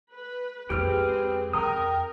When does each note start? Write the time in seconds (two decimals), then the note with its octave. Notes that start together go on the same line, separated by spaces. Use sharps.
0.13 B4
0.70 F2 G#3 C4 G4 G#4 B4 F6
1.53 F2 A#4 G5 A#5 D#6